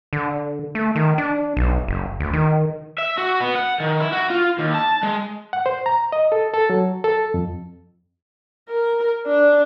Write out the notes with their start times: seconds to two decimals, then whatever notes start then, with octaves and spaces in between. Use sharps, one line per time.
0.13 D3
0.75 A3
0.96 D#3
1.18 D4
1.57 B1
1.88 F#1
2.20 D2
2.33 D#3
2.98 E5
3.17 F#4
3.40 B3
3.55 F#5
3.80 D#3
4.00 E4
4.13 F#4
4.30 F4
4.59 D#2
4.75 A5
5.03 G#3
5.53 F#5
5.66 C5
5.86 A#5
6.12 D#5
6.32 A4
6.54 A4
6.70 F#3
7.04 A4
7.34 F2
8.68 A#4
9.26 D4